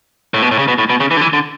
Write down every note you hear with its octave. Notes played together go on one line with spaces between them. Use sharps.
A2
B2
A2
C#3
B2
A2
B2
C#3
E3
D3
E3
D3